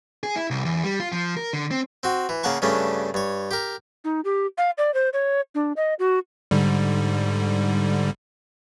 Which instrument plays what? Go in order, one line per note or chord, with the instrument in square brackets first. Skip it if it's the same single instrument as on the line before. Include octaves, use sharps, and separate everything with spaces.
[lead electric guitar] G#4
E4
C2
E2
G3
F4
F3
A#4
D3
C4
[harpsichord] C4 F#4
E3
C#3 A#3 F#5 A5 C#6
G2 C#3 A3 C#4 D4
G2 C#5
G4 A#4
[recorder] D#4
G4
F5
D5
C5
C#5
D4
D#5
F#4
[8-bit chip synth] G#2 D3 G3